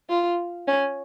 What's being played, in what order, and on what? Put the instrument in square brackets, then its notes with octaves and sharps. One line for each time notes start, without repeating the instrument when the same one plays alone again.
[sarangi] F4
C#4